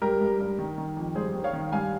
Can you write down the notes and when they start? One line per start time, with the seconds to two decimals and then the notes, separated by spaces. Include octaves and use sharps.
0.02 G2 G4 A#4
0.21 G2
0.40 G2
0.58 D#3
0.78 D#3
0.97 F2
1.15 G2 G#4 C5
1.35 D#3
1.44 C#5 F5
1.53 D#3
1.72 G2 F5 G#5